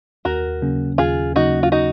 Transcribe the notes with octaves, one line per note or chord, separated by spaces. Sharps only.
D#2 F#4 A#4
C#3 F#3 A#3 C#4
D#2 F4 G#4
C#3 F#3 A#3 C#4 D#4 F#4
F4
D#4 F#4